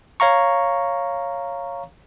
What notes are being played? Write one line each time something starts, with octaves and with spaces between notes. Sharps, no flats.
C#5 F5 A#5 C#6